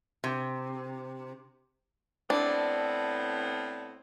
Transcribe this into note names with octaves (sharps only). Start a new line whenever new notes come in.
C3
A2 B3 C4 D4